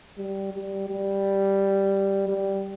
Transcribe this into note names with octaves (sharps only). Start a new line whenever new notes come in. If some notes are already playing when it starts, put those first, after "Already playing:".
G3
G3
G3
G3